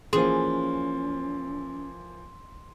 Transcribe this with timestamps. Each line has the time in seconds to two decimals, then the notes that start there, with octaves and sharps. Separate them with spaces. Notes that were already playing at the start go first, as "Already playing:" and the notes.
0.13 E3 F3 A#3 C#4 G#4 C6